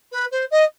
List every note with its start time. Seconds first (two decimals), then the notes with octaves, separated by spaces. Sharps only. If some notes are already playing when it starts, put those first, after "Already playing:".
0.12 B4
0.31 C5
0.51 D#5